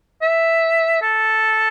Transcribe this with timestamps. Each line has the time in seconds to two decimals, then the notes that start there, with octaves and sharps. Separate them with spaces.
0.22 E5
1.02 A4